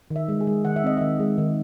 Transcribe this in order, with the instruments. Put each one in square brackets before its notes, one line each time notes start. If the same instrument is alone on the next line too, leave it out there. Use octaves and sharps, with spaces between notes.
[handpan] D#3
E5
G#3
G#4
G#3
D#3 F#5
E5
C4 D#5
D#3 E5
G#3
D#3